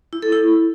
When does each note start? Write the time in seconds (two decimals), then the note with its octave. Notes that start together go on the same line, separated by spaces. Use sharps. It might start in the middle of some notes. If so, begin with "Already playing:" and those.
0.13 E4
0.22 A4
0.32 E4